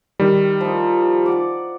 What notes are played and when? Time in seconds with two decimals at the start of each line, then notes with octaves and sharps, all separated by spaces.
0.20 D#3 G3
0.61 F3 D#4
1.26 D5 F#5